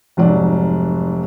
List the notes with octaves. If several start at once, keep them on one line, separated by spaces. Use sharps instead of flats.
F1 G#2 F#3 D5